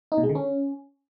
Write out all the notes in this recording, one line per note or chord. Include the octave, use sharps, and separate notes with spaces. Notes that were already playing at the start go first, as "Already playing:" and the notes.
D#4
B2
G#3
D3
C#4